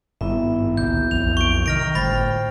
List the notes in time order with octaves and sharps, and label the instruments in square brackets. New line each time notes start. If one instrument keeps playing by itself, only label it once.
[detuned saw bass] G#1 [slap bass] G2 [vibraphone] B3 E4 E5
[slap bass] C#2 A#2 D3 [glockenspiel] G6
[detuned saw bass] B1 [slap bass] F2 F#3 [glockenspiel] F7
[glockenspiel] C#6 D7
[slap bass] C3 [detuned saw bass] D#3 [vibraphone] D#5 [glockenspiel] F6 A#6 D7
[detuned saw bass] G1 [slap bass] A2 D3 G3 [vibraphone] C5 G5 [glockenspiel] B5 A6